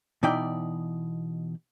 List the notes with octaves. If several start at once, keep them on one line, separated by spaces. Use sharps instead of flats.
B2 E3 D#4 E4 D5 G5